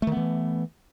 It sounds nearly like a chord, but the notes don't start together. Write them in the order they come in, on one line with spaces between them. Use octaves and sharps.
A3 D#3 B3 E3